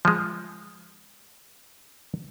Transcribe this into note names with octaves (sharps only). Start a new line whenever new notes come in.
F3 G#3